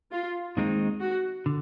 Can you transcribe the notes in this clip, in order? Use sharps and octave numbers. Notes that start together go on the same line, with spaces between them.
F4
D#2 D#3 G#3 C4 D#4
F#4
D3